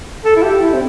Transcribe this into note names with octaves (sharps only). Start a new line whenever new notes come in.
A4
E4
G4
E4
C4